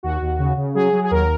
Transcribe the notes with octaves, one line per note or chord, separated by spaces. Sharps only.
D#2 F#4
D#2
C#3
C#3
F#3 G#4
F#3
G#4
D#2 A#4